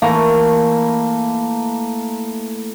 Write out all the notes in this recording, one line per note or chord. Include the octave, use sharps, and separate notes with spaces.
E3 A3 A#3 A#5